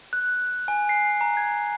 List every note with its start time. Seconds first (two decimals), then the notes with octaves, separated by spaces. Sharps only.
0.13 F#6
0.68 G#5
0.89 C7
1.21 A#5
1.37 G#6